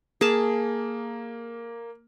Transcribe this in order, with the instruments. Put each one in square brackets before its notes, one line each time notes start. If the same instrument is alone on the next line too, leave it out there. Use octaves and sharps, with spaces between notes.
[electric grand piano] A#3 [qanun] G#4 A5